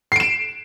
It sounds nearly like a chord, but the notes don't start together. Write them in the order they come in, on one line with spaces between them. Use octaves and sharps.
C7 D7 E7